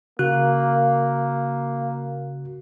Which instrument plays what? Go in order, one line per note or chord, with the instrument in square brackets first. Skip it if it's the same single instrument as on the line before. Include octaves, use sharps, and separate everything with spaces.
[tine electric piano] C#3 F#4 F#6 [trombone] A#3